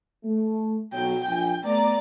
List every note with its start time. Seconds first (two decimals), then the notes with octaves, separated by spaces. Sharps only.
0.24 A3
0.93 B1 F#3 G5
1.26 A#1 G#5
1.64 A3 B3 D5 A#5